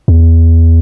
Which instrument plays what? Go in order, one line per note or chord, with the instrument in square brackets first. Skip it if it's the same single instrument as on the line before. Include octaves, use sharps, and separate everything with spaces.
[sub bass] E2